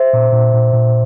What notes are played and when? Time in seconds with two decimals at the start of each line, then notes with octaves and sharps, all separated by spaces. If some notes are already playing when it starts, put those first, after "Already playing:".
Already playing: C5 E5
0.13 A#2
0.33 A#2
0.54 A#2
0.74 A#2